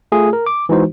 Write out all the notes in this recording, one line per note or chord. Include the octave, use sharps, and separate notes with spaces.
A3 F4 G#4
A#4
D6
E3 G#3 D#4 F#4 C5